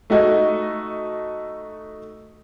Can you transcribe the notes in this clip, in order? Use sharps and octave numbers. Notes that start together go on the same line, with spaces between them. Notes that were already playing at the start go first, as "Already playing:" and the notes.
A3 D#4 F#4 D#5